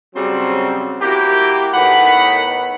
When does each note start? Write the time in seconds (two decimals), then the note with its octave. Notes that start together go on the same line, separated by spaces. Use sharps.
0.14 C#3 F#3 G3 C4
1.01 A#3 E4 F#4 G4
1.74 A2 D#3 B3 F#5 B5